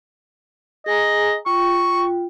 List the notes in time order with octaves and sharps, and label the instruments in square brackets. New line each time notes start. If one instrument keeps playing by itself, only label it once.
[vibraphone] G#4 G#5 A#5 [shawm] D#5
[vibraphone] F4 G5 [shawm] C#6